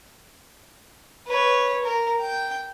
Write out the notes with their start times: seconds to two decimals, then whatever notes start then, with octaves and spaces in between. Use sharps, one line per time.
1.27 B4 C#5
1.83 A#4
2.21 G5